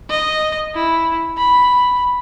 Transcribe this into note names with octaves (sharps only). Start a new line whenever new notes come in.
D#5
E4
B5